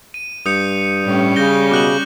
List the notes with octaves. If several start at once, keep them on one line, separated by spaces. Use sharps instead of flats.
D#7
G2 D#6 G6 C#7
A2 G3 C#4
C#3 G6 A#6 G7
B2 D6 F#6 F#7